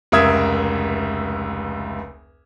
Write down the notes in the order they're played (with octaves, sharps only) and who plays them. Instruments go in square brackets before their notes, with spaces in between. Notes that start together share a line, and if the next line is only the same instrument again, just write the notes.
[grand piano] F1 C#2 A#4 E5 D#6 G#6